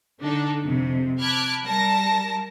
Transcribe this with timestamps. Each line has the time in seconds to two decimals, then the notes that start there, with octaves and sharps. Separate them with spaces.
0.21 D3 D4 D#4 A4
0.62 F2 C3
1.21 A5 B5 D6 F6 F#6 G#6
1.63 G3 A#4 A5 A#6